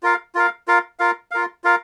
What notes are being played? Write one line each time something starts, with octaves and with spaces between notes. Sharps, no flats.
F4 A#4 F5
F4 A#4 F5
F4 A#4 F5
F4 A#4 F5
F4 A#4 F5
F4 A#4 F5